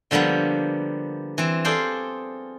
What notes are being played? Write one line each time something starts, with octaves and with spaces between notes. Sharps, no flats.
D3 F3 G3 A#3 B3
E3 C4
F4 G#4 A4 C5 D5